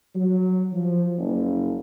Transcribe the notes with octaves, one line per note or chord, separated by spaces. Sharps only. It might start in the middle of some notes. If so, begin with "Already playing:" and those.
F#3
F3
F#1